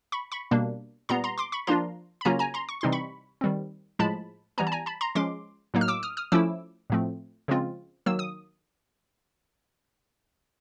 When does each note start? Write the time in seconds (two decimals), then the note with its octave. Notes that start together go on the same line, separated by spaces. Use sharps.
0.12 B5 C#6
0.32 B5 C#6
0.51 B2 G3 A#3 D4
1.09 A#2 G3 B3 A#5 C6
1.24 A#5 C6
1.38 C6 D6
1.52 B5 C#6
1.67 F3 A#3 D4 F4 A#5 C6
2.21 B5
2.25 C#3 F#3 A#3 C#4 F4 G#5 A#5
2.39 G#5 A#5
2.54 A#5 C6
2.69 C#6
2.81 C3 E3 G3 C4 D#4 C6
2.92 B5 C#6
3.41 D#3 G3 C4
3.99 A2 F3 G#3 A5 B5
4.58 E3 G3 B3 G#5 A#5
4.67 A5
4.72 G#5 A#5
4.86 A5 B5
5.01 A#5 C6
5.15 F3 G#3 C#4 C6 D6
5.74 A2 F#3 A#3 D#4
5.81 F6
5.88 D6 E6
6.03 D#6 F6
6.17 D#6 F6
6.32 F3 A3 C#4 E4 D6 E6
6.90 A2 F3 A3 C4
7.48 C#3 F3 G#3 C4 F4
8.06 D#3 F#3 A#3 E6
8.19 D#6